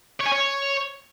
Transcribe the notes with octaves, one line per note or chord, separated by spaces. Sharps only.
C#5
G#5
C#5